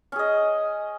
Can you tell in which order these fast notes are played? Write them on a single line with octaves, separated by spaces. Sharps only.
C#4 G#4 D#5